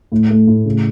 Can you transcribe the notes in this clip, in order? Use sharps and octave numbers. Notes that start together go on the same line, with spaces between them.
A2
A3
A2
C#3